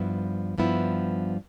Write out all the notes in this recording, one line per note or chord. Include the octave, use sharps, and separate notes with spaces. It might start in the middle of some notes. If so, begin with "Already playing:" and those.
Already playing: G2 F3 B3 E4
G2 F3 B3 E4